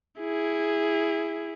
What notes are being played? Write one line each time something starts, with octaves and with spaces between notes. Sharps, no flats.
E4 G#4